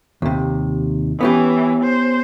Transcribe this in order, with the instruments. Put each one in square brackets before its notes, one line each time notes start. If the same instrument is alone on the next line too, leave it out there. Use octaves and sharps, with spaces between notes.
[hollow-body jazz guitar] D#2 C3
[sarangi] E3 [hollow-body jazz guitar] B3 C#4 G4
[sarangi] C5